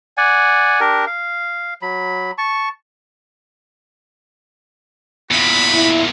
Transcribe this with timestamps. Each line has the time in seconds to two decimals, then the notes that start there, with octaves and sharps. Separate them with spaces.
0.17 D5 F#5 G#5
0.80 D4 G4 A#4
1.07 F5
1.82 F#3 B5
2.38 A5 C#6
5.31 E2 A#2 F#4 B5
5.73 E4